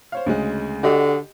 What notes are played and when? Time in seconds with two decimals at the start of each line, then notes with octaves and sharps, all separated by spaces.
0.12 C5 C#5 F5
0.26 D2 C#3 G#3
0.83 D3 F#4 G4 D#5